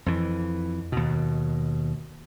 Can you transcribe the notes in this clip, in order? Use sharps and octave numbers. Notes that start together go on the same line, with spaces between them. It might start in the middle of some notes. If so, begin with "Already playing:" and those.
F2 E3
D#2 B2